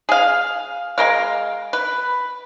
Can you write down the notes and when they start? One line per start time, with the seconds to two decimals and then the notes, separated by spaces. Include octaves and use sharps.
0.09 G#4 F5
0.98 G#3 A#4 F5
1.73 B4